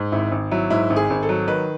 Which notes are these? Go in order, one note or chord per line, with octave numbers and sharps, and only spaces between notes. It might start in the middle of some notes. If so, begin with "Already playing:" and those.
Already playing: G#2
G#1 E4
G#1
F#3 E4
G#2 E4
G#1
G#4
G#1
A4
F#3
D#3 B4